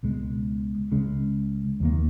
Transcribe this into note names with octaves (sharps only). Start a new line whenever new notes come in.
C#2 B2 G#3
C#2 C#3 G#3 C#4
D#2 D#3 A#3